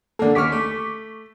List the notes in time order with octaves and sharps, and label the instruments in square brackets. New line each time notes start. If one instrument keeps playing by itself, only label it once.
[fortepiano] D3 A#3 [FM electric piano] A4 D5
[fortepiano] D#2 C#4 F6 [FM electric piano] C#6 D6 B6
[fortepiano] A3